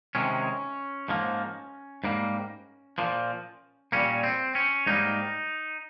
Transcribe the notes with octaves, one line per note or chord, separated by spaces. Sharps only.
C3 D#3 G#3 C#4
G#2 F3 A#3
G#2 G3 A#3
A#2 F3 A#3
A#2 G3 A#3 C#4
C4
C#4
G#2 G3 A#3 D#4